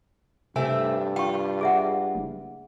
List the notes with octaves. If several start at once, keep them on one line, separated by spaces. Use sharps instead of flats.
G2 C3 A3 C4 D4 G#5
F4 G5 C#6
G#4 E5 F#5
F#1